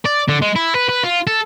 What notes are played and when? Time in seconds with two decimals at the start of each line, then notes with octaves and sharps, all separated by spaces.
0.05 D5
0.29 D3
0.42 G#3
0.56 E4
0.75 B4
0.89 B4
1.04 F4
1.27 A4